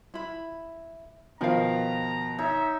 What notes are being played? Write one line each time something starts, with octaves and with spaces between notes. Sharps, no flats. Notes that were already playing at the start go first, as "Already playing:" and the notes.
E4 B5
B2 D#3 F3 A#4 F5 A#5
D#4 C#5 E5